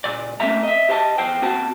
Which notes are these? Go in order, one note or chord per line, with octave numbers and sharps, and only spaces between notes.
C#2 A#2 D5
A3 A#3 C4 C#4 E5 A#5
D#5 E5
G4 C5 D#5 A5
E2 C5 G5
A#3 C4 F#4 G5 A5